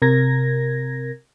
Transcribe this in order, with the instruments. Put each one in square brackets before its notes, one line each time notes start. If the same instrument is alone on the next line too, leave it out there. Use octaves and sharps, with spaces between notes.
[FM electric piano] C3 A#4 G#6 A#6